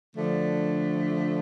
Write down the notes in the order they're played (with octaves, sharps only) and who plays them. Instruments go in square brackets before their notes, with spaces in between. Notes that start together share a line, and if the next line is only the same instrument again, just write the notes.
[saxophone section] D3 F3 A3 D4